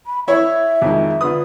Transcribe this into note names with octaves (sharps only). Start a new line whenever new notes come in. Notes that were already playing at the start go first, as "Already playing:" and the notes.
B5
E4 C#5 E5
F2 D#3 G#3
D3 F4 B4 D#6